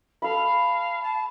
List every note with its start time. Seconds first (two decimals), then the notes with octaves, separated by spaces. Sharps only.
0.22 A4 F5 B5
1.02 A5